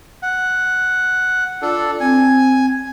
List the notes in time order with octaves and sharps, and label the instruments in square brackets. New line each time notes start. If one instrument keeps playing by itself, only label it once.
[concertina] F#5
[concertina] D4 A4 [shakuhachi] F4
[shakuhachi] C4 [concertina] G#5